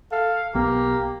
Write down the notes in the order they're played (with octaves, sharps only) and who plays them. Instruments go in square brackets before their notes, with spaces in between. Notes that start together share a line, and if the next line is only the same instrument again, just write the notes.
[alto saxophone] A4 [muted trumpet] F5
[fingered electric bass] B1 B3 [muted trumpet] A#3 [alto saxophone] G4